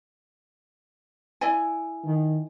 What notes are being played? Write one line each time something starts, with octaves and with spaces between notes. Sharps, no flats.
E4 D5 G#5
D#3